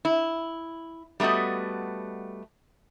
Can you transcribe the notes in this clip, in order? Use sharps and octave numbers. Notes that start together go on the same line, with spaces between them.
E4
G3 A3 B3 F#4 D#5